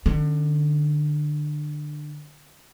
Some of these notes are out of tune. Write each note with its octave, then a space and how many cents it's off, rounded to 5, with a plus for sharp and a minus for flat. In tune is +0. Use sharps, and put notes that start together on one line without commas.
D3 +25 C#4 +0